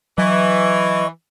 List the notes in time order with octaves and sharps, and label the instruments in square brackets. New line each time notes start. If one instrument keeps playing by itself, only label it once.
[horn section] E3 [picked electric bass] F#3 [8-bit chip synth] D#5 C#6